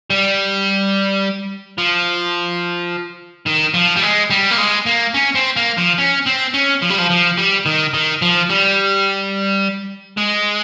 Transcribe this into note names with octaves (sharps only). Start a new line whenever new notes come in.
G3
F3
D#3
F3
G3
G#3
G3
A#3
G#3
A#3
C#4
C4
A#3
F3
C#4
C4
C#4
F3
G3
F3
F3
G3
D#3
D#3
F3
G3
G#3